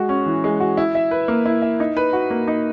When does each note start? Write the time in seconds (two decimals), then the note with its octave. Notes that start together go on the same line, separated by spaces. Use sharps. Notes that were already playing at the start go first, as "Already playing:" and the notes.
Already playing: G#3 F#4
0.09 C#4
0.26 E3
0.44 G#3
0.60 F#4
0.77 E4
0.95 E5
1.11 B4
1.28 A#3
1.46 E4
1.62 E5
1.80 D#4
1.97 B4
2.13 F#4
2.30 A#3
2.48 D#4